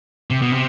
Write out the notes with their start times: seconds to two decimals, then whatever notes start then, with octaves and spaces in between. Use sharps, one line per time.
0.30 C3
0.42 B2
0.52 C3